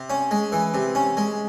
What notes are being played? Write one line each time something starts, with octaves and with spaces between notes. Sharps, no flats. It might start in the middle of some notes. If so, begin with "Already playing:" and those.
Already playing: C3
C#4
G#3
E3
C3
C#4
G#3